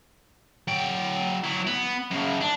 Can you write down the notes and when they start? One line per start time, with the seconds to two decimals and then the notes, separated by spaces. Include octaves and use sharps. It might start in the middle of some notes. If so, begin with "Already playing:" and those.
0.68 F#3 G5
1.44 F#3 E4
1.67 B3
2.11 F#2 C#3
2.42 D4